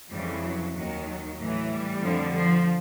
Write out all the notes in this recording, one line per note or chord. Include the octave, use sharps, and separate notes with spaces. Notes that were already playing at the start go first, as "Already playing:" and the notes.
F2 C#3 E3 G3
F#3
D#2 D#3 F#3
F#3
A2 E3
G3
F2 D3 F3
F3